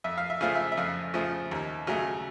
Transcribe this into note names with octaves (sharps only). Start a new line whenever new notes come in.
F2 E5
F5
E5
C#3 F3 A3 F5
E5
E5
F2 F5
C#3 F3 A3
D#2
C#3 F#3 A3